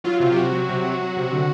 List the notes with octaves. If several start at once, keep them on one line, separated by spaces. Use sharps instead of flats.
F#3 F4
C3 F4
G4
C3 F#4
F#3
C3
F#3
F#3
C3
D3